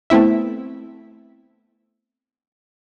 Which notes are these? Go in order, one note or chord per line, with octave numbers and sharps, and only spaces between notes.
A3 B3 C4 E4 E5